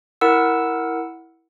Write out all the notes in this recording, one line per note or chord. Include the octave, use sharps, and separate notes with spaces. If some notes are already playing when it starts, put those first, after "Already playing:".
E4 A#4 F#5 E6